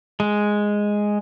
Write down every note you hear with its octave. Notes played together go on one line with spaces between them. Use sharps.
G#3